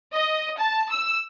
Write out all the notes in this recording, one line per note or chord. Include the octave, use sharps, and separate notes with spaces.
D#5
A5
E6